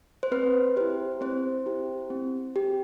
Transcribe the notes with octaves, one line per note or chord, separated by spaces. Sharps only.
C5
C4 B4
E4 G4 C5
C4 C5
E4 G4
C4
G4